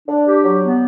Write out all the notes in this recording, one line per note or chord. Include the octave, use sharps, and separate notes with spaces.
D4
G4
F#3
B3